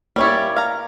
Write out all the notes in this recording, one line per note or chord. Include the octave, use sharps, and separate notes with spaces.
G3 A#3 C#4 E4 C#5 D5
F5 A#5